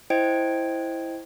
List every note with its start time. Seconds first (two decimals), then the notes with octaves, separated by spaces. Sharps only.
0.10 E4 C5 D#5 G5 G#6 D7